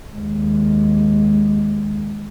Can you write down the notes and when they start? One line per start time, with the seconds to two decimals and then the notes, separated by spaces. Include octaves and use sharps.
0.13 D#2 G#3